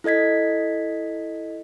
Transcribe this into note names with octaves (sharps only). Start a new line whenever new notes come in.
E4 A4 D#5 G#6 B6